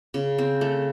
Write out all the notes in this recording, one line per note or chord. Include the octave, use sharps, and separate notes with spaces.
C#3
C4
A3